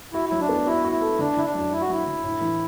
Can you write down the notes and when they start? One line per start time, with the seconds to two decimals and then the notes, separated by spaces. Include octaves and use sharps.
0.13 E4 F#4
0.29 F#3 E4
0.41 D4
0.49 B3
0.67 E4 F#4
0.84 F#4
0.93 E4
1.01 A4
1.19 D3 D4
1.37 D3 E4
1.46 D4
1.55 F#2
1.71 F#2 E4
1.81 F#4
1.89 F#3 E4
2.06 D3
2.24 A2
2.41 E3